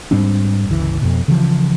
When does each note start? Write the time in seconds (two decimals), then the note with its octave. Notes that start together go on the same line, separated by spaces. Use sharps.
0.11 G#2 G3 C4 D4
0.69 G1 C#2 E3
1.01 F2 B2
1.28 C#3 E3 F3